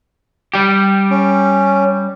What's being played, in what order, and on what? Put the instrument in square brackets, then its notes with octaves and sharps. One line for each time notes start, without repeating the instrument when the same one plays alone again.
[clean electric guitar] G3 G4
[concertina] C#4